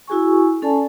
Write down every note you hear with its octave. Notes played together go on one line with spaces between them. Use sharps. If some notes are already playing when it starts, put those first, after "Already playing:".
E4 F#4 G#4 G#5 C#6
C#4 A4 D5 G#5 A5